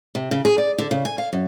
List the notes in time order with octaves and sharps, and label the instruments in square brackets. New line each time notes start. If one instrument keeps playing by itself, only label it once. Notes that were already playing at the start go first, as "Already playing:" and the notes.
[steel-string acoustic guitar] C3
C#3
G#4
D5
D3
C#3
G#5
F5
F#2